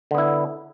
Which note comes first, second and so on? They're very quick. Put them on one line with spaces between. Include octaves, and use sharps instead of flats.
D3 B3 E4